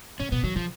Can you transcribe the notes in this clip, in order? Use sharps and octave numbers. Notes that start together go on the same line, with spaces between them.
C#3 C#4
B2 B3
D#3 F#3
C#3 F3